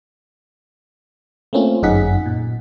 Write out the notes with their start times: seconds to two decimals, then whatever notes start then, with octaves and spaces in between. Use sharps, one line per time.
1.53 A3 A#3 C4 C#4 F4
1.82 G1 F#2 D#4 G#4 F#5 B6
2.26 A#2